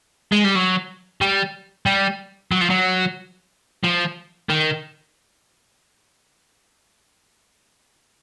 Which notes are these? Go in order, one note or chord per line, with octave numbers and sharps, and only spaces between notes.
G#3
G3
F#3
G3
G3
F#3
F3
F#3
F3
D#3